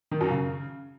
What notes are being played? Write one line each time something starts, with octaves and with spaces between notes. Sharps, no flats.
D#3
F#2
C#3